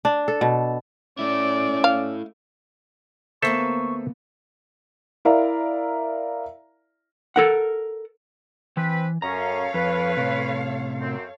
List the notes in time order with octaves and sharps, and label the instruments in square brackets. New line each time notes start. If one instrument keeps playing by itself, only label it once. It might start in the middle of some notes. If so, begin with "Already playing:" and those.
[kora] D4
A4
B2
[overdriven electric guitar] A3 E4 [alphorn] C#4 [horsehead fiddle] D5
[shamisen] F5
[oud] D2 A#3 B3 [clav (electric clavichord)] A4 C5 E5 [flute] C#6
[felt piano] E4 A#4 D5 E5 F5 A#5
[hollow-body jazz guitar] A4 A#4 F#5
[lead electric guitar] E3 [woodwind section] C4 B4
[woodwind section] F#2 C#4 [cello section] A4 C#5 F5 [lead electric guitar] A#5
[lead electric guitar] F2 [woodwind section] B4
[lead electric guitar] A2 C3
[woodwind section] F#2 C4